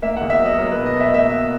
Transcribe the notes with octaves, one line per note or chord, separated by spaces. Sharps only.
A#3 E5
F#5
E2
E5
F#3
D#5
F#3 A#4
B4
B2
D#5
B2 E5
A#3 E5